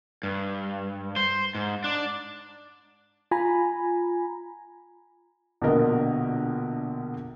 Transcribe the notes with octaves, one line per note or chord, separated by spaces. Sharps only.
G2
C5
G#2
D4
F4 G#5 A#5 B5
A#1 B2 D3 A#4 D#5